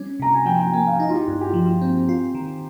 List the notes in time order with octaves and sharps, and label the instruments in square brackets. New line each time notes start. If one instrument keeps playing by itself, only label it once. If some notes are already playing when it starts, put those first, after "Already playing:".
Already playing: [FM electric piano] G3 C#4
[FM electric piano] C3 [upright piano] A#5
[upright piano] G#5
[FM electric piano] F3 [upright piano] G5
[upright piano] G5
[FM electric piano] A#3 [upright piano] G#5
[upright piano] F5
[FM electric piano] D#4 [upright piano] D#5
[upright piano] F4
G4
[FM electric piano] G2 [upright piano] F4
[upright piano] G4
F4
[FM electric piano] F3
[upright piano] F4
[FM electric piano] C4
F4
D#3